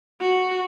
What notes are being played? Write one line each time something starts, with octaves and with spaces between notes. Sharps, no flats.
F#4